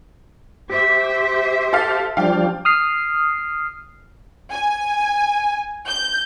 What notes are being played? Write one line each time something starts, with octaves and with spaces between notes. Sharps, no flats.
G4 C5 E5
A4 F5 A6
F3 G3 D4 F5 G5
D#6 F6 C7
G#5
G6